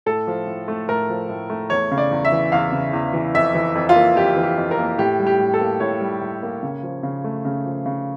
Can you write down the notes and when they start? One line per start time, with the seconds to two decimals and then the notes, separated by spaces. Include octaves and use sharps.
0.06 A2 A4
0.27 F3
0.47 A2
0.68 A3
0.89 A2 A#4
1.09 F3
1.29 A2
1.50 A3
1.70 E2 C#5
1.91 C#3
1.98 D5
2.11 E2
2.25 E5
2.32 E3
2.52 E2 F5
2.72 C#3
2.93 E2
3.13 E3
3.34 F2 E5
3.55 E3
3.75 F2
3.89 F4
3.96 A#3
4.16 F2 G4
4.36 E3
4.44 G4
4.58 F2
4.71 A#4
4.78 A#3
4.98 A2 G4
5.20 G3
5.27 G4
5.40 A2
5.54 A4
5.61 A#3
5.80 A2 C#5
6.01 G3
6.21 A2
6.43 A#3
6.63 C#3
6.83 F3
7.03 C#3
7.24 A3
7.45 C#3
7.66 F3
7.86 C#3